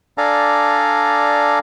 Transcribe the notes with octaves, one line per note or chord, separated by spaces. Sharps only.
D4 A4 D5 F5 G#5 A#5